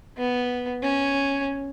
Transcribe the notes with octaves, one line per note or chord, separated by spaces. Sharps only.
B3
C#4